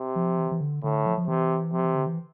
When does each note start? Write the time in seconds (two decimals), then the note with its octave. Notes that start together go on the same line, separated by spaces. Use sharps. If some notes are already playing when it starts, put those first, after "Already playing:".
Already playing: C3
0.16 F3
0.38 E3
0.51 E3
0.61 D3
0.83 A2 D3
1.06 F3
1.18 F3
1.28 C3 E3
1.72 C3 F3
1.85 E3
1.95 D3
2.07 E3